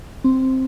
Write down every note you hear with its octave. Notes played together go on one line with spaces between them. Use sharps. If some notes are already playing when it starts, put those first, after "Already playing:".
C4